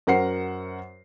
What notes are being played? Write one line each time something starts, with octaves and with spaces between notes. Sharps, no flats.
F#2 A#4 C5 F#5 C7